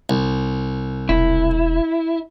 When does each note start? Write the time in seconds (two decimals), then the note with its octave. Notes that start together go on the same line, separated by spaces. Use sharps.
0.09 C2
1.09 E1 E4